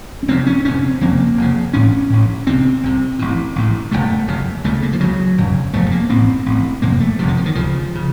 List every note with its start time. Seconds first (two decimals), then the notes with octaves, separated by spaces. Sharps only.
0.23 C#4
0.28 F1 F2 C3 C4
0.46 C#4
0.65 F1 F2 C3 C#4
0.83 C4
1.01 F1 F2 C#3 A#3
1.37 F1 F2 C#3
1.73 A1 A2 C#4
2.10 A1 A2
2.47 C2 C3 C4
2.83 C2 C3
3.19 A1 A2
3.56 A1 A2
3.91 F#1 F2 C3 A3
4.28 F#1 F2 C3
4.64 C#2 C#3 A3
4.83 A#3
4.93 F3
5.00 C#2 C#3 F#3
5.38 F1 F2 C#3
5.73 F1 F2 C#3 A3
5.91 A#3
6.10 A1 A2 C4
6.46 A1 A2
6.82 F#1 F2 C3 A#3
7.00 A3
7.19 F#1 F2 C3 F3
7.28 D#3
7.37 F3
7.46 D#3
7.55 C#2 C#3 F3
7.95 C#3